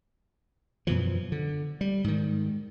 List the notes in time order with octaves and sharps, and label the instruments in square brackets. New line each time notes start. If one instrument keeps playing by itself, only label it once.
[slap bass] F#2 B2 E3 F3
D3
G3
G#2 D#3